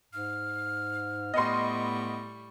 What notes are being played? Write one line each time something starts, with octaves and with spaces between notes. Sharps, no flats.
G#2 F6
A2 G3 B3 D#5 C6 C#6